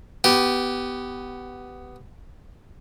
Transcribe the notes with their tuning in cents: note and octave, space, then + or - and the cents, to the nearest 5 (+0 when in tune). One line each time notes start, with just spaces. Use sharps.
B3 +10 G4 -10